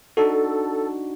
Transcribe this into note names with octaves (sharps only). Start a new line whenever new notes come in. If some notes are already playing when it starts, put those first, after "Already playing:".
D4 D#4 F#4 A4